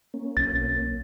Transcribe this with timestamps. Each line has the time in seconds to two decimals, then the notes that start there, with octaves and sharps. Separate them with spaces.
0.14 A#3 C#4
0.37 B1 A6